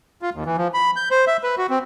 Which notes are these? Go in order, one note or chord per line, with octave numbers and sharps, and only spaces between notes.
F4
D#2
E3
F3
B5
G6
C5
E5
B4
F#4
C4